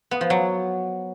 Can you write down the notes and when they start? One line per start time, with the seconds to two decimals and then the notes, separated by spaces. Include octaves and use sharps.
0.11 B3
0.21 F3
0.30 F#3